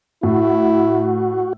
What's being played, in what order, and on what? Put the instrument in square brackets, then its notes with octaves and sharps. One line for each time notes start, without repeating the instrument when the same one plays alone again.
[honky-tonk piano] A2 [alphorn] E4 [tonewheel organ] F#4